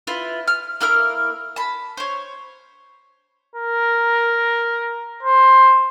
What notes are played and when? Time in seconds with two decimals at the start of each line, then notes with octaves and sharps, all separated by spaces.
0.07 E4 F4 B4
0.48 F6
0.81 A#3 E4 A#4 F6
1.56 A5 B5
1.97 C5 C#5
3.55 A#4
5.23 C5